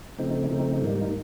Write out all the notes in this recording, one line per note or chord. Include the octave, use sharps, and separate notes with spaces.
C#3 F3 A3 C4 D#4
C#3 F3 A3 C4 D#4
G#2 D#3 G3 A#3 D#4